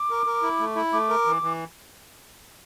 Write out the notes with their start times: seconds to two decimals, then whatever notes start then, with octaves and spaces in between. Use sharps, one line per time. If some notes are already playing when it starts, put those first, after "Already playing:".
Already playing: D6
0.10 A#4
0.26 A#4
0.43 E4
0.59 A3
0.76 E4
0.93 A3 D6
1.09 A#4
1.25 E3
1.42 E3